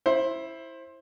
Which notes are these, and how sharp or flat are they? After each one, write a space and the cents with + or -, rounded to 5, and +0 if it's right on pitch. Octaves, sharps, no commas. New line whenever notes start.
E4 +0 C5 +20